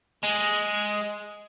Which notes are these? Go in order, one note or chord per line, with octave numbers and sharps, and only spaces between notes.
G#3